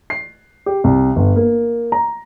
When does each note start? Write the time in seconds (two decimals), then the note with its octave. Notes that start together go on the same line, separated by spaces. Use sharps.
0.10 C7
0.66 G4
0.84 C2
1.16 G1
1.36 A#3
1.92 A#5